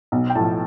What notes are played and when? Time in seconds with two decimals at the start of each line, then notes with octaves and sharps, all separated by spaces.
0.12 B1
0.30 G5
0.35 A2 F3 A5